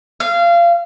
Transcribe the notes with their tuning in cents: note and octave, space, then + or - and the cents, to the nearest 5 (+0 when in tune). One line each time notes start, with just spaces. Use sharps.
F5 -25